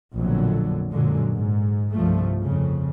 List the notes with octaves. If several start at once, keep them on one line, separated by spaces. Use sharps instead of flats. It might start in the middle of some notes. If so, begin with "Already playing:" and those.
A#1 F2 B2 D3 F#3
F#2 A#2 D3 F#3 G#3
G#2
C2 G2 F3 A3
F2 C#3